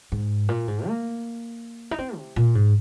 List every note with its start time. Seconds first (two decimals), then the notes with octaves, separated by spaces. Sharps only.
0.12 G#2
0.49 A#2
0.68 G#2
0.87 A#3
1.91 D#4
1.99 C4
2.17 C3
2.36 A#2
2.55 G#2